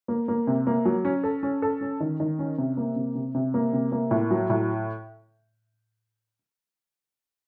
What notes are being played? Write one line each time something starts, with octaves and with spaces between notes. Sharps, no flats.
A#3
A#3
C3
A#3
F#3
C#4
A4
C#4
A4
C#4
D#3
D#3
C#4
C3
A#3
C3
C3
C3
A#3
C3
A#3
A2
F#3
A2